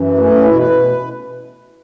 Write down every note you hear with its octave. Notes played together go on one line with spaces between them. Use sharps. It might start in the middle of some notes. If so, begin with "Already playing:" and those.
Already playing: F#2 E3
A3 C#4
C#4
B2 E4
B4
B2